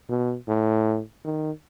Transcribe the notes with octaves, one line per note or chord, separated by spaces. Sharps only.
B2
A2
D#3